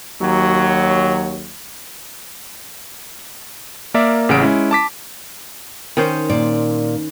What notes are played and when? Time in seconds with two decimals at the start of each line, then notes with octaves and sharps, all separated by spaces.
0.20 D#2 F#3
3.94 A#3 A#4 D5 E5
4.29 A1 C#3 F#5 D7
4.42 G#3 C#4 E4
4.71 A5 D6 B6
5.97 D#3 C#4 C5
6.29 A#2 D5